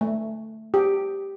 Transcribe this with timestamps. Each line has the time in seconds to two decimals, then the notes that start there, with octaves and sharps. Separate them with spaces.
0.01 A3
0.74 G4